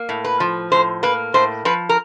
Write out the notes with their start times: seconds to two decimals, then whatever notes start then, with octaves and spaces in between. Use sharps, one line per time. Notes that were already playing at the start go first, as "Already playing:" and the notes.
Already playing: A#3
0.09 A2
0.24 B4
0.40 F3
0.72 A2 C5
1.03 A#3 B4
1.34 A2 C5
1.65 F3 B4
1.89 A#4